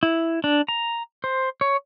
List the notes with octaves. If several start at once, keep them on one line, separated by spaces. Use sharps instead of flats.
E4
D4
A#5
C5
C#5